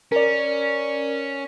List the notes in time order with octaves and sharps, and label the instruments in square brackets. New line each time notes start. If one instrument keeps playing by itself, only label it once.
[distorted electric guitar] C#4 [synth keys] A#4 D5